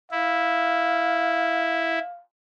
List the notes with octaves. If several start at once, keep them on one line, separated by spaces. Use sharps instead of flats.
E4 F5